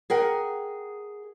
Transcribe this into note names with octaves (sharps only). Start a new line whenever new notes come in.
G#4 A#4 F#5 G5